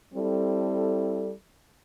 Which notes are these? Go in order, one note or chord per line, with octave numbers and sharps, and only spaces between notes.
G3 C4 E4 A4